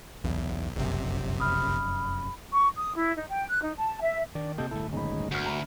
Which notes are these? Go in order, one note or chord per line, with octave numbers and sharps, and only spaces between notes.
B1 E2
F1 A#1 F#2 C3
B5 D#6 F6
C#6
D#6
E4
D#4
G5
F#6
D#4
A5
E5
D#3 D4 D5
C3 A#3 G4 A4 D#5 G6
D1 G1 A3 E4 A4
D#1 G#3 C#4 D#4 B5
D2 F#4 F6 G6
E5 A#5 B5